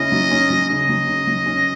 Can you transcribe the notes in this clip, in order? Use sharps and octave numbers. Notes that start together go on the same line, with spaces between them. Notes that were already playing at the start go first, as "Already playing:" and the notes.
Already playing: C#3 C#4 E4 D#5
F#3
C#4
F#3
C#3 D#5
F#3
C#3
F#3
C#4